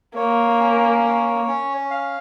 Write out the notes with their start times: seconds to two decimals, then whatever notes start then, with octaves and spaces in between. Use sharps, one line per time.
0.16 A#3 C#5
0.60 C#4
1.04 C#5
1.48 C#4
1.90 F5